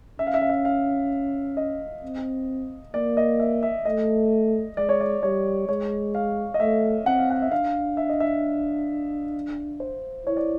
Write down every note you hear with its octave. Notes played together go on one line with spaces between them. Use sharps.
C#4 E5
F5
E5
F5
E5
F5
D#5
C4
A#3 D5
D#5
E5
E5
A3 D#5
G#3 D5
C#5
D5
G3 C#5
G#3 C#5
F5
D#5
A3 E5
C4 F#5
F5
F#5
E5
D4 F5
E5
D#5
E5
C5
E4 C#5
D5